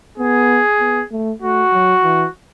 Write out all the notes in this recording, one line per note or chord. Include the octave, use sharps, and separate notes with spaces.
B3 G#4
B3
A3
A3 F#4
F#3
E3